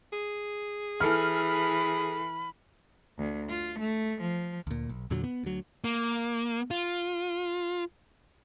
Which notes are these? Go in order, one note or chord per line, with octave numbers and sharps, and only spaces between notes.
G#4
E3 A4 B5 F6
D2
F4
A3
F3
D2 A#2
B1
E2 A#2 D3 F#3
B3
D2 F#3
A#3
F4